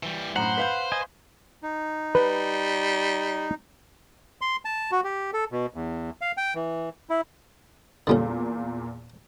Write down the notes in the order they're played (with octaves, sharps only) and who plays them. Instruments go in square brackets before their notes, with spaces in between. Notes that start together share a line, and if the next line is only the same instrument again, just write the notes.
[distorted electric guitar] E3 G3
[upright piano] F#2 A2 B5 [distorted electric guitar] C5 [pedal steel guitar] F#5 [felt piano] A#5
[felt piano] B4 F5 G6 [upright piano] B5 B6
[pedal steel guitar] D#5 G#5
[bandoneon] D#4
[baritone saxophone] G3 [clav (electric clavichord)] B4
[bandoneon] C6
A5
F#4
G4
A4
B2
E2
F5
G5
E3
E4
[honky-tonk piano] E2 A#2 A#3 [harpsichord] D3 G3 C#4